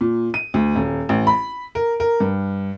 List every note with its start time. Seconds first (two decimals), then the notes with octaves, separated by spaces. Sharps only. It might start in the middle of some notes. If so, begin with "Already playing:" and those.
0.01 A#2
0.34 D#7
0.54 D2
0.76 D#1
1.09 A1
1.27 B5
1.75 A#4
2.00 A#4
2.20 G2